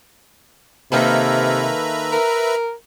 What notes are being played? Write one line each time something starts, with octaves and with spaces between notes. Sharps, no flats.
C3 D#3 A#3 A4 B4 E5 A#5
A#4